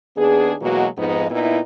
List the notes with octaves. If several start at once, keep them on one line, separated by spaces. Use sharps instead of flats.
D#2 B3 D4 G#4
B2 E3 F#3 G#3 A#3 F#4
F2 G#2 F3 B3 D#4
A#2 B3 D#4 E4